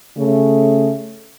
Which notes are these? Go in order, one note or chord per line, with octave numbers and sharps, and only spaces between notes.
C#3 A3